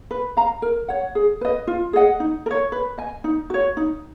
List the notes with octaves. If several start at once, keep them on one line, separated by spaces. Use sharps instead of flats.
B4
F5 A#5
A#4
C#5 F#5
G#4
B4 D#5
F4
G#4 D#5 F#5
D#4
A#4
C#5
B4
D#5 G#5
D#4
F#4 C#5
D#4